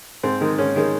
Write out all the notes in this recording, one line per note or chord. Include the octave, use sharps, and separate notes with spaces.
G#2 C4
D#3 G#3
G#2 C#4
D#3 G#3